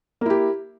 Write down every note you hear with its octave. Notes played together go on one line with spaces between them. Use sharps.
A#3 E4 G4